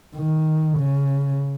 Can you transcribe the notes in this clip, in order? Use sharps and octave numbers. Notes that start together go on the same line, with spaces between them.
D#3
C#3